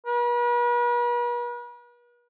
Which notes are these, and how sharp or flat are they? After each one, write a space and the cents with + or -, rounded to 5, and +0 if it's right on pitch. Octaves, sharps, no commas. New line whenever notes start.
B4 -45